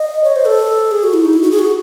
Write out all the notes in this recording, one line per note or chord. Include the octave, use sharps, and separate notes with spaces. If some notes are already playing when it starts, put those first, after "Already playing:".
Already playing: D#5
C#5
C5
A4
G#4
F#4
E4
D#4
E4
F#4
G#4
F#4